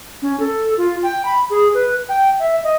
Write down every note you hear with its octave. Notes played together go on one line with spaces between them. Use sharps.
C#4
A4
F4
G5
B5
G#4
B4
G5
E5
D#5